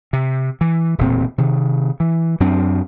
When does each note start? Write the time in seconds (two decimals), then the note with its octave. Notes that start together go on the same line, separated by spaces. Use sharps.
0.13 C3
0.61 E3
0.98 E1 D2 A#2 C4
1.38 C3 D#3
2.00 E3
2.40 F#2 F#3 C4 D4